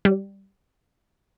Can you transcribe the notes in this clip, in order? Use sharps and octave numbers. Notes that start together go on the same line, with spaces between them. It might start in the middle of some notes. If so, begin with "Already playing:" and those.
G3